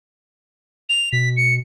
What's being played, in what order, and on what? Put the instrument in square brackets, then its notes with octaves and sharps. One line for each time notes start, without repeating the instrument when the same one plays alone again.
[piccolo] F7
[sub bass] B2 [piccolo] B6
[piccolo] C#7